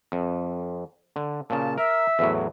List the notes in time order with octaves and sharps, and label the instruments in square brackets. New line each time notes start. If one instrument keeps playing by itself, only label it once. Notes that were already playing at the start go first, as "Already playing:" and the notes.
[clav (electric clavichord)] F2
D3
[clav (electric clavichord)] A#2 C#3 [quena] A5
[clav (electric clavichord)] A#4 [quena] E5
[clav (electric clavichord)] E2 A2 F#3